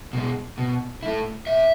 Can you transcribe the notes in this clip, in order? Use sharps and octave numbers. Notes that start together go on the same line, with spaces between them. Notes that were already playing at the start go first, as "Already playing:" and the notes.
B2 G#3
B2
A3 E4
B2 E5